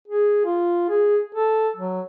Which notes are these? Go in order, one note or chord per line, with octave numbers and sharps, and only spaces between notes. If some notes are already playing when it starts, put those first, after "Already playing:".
G#4
F4
G#4
A4
F#3